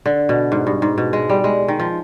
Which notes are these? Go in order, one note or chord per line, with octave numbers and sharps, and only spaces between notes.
D3
B2
G#2
G2
G#2
B2
G#3
G3
G#3
D#3
F3